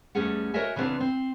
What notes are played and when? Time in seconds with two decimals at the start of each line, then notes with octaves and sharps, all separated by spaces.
0.15 E2 G3 A3 C#4 G#4 F#5
0.54 F#4 A#4 C#5 D#5 E5 G#5
0.76 C#3 E3 G3 B3 C4 D4
1.00 C4